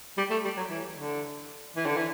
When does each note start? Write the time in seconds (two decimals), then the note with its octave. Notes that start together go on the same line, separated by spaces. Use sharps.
0.17 G3
0.30 A3
0.44 G3
0.57 F#3
0.70 E3
0.97 D3
1.76 E3
1.86 D3
1.97 E3